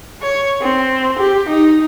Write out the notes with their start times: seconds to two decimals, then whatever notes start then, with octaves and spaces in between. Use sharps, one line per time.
0.22 C#5
0.62 C4
1.19 G4
1.49 D#4